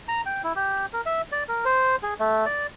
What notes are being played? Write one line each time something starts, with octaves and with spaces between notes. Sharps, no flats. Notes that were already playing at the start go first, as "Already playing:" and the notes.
A#5
G5
E4
G4
A#4
E5
D5
A#4
C5
G#4
A3
D5